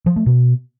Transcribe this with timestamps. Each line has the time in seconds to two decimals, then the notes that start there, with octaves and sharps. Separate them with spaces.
0.06 F3
0.16 A3
0.26 B2